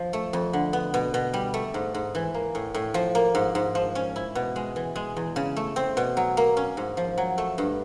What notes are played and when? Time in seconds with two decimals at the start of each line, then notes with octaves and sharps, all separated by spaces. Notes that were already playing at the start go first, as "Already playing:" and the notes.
Already playing: F3
0.13 A3
0.33 F2
0.53 D3
0.73 B3
0.94 B2
1.14 B2
1.34 G3
1.54 A3
1.74 G#2
1.94 G#2
2.15 E3
2.34 A#3
2.55 A2
2.74 A2
2.94 F3
3.15 A#3
3.35 G#2
3.55 G#2
3.75 F3
3.95 C#4
4.16 E4
4.35 B2
4.56 G#3
4.76 E3
4.96 G#3
5.17 E2
5.36 C#3
5.57 A3
5.76 C4
5.97 B2
6.17 F#3
6.37 A#3
6.57 C#4
6.77 G#2
6.97 F3
7.18 F#3
7.38 A3
7.58 G2